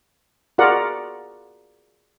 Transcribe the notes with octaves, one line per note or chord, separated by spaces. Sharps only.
F4 F#4 G#4 A#4 D5 F#5